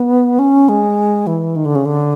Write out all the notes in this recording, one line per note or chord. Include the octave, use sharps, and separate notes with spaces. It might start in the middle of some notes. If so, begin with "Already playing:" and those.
Already playing: B3
C#4
G#3
E3
D#3
D3
C#3
D3